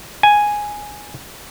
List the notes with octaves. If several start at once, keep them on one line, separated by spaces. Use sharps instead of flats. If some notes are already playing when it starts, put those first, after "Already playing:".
G#5